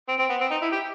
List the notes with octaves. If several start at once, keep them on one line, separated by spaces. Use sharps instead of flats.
C4
C4
B3
C4
D#4
E4
G4